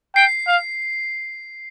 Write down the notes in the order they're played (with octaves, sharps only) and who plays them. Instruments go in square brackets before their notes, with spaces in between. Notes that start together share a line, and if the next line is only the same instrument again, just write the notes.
[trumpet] G5 [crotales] C7
[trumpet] F5